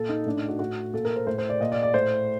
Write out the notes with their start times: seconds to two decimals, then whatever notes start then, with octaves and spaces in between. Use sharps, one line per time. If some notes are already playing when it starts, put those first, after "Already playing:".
Already playing: A#2 A4
0.09 D#4
0.26 A2 D4
0.37 D#4
0.49 F#4
0.59 A2 F#4
0.94 A#2 A4
1.05 A#4
1.16 C5
1.27 A2 C5
1.38 C5
1.50 D5
1.60 A#2 D#5
1.72 D5
1.83 D5
1.94 A2 C5